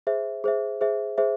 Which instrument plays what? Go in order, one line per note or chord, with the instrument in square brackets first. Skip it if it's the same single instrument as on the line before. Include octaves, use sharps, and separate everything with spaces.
[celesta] G#4 C5 E5
G#4 C5 E5
G#4 C5 E5
G#4 C5 E5